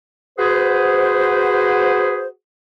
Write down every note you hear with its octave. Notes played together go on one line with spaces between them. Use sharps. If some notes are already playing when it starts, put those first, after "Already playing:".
F#4 G#4 B4 C5